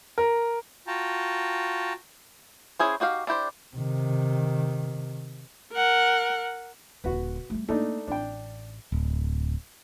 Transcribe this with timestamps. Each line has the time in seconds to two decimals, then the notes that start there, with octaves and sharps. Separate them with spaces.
0.18 A#4
0.87 F4 F#4 G5 A5 A#5
2.79 C#4 E4 G#4 C5
3.00 D#4 F#4 G4 F5
3.27 D4 E4 G4 C5
3.76 C3 D#3
5.73 A#4 F#5
7.04 D#1 D3 F#4 B4
7.50 G3 A3
7.69 A3 A#3 D4 D#4
8.08 A1 D4 G5
8.92 D1